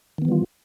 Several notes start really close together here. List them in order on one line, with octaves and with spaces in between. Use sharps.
D#3 B3 E3 G3 F4